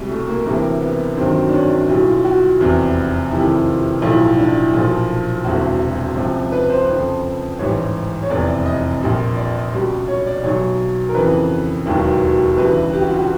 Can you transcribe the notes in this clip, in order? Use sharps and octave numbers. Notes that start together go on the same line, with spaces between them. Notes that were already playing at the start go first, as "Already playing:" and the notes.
Already playing: C2 B2 G3 G#3
A3
A#3
D2 C3 E3 G3 A#3
B3
G1 G2 D#3 F#3 C4
D4
C#4
D4
B1 B2 G3 E4
F4
F#4
F1 E2 C3
F2 C3 D#3 G3 E4
F4
B1 A2 F3 E4
D#4
D4
E4
B1 A#2 F3 F4
E1 D2 C3 F#4
C#2 C3 F3
B4
C5
F2 C#3 F3
A1 G#2 E3 G3 C#5
C#5
F1 E2 C3 E3 D5
D#5
A#1 A#2 G3
D5
C#2 B2 G3
C#5
D5
B1 B2 F#3 C#5
A#4
F2 C#3 E3 B4
E1 D#2 D#3 F#3
D2 C#3 E3 G3 B4
G4
F#4
F4
F#4